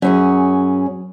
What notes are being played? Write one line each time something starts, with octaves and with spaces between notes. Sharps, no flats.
F#2 C#4 G#4